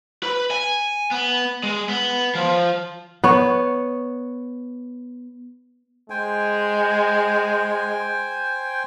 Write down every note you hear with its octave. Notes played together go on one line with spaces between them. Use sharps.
B4
G#5
B3
G#3
B3
F3
B3 C#5
G#3 C5 G5 G#5